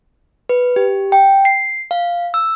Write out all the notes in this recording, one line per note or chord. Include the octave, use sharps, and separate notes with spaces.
B4
G4
G5
C7
F5
E6